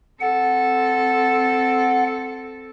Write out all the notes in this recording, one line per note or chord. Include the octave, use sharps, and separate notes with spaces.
C4 A4 F#5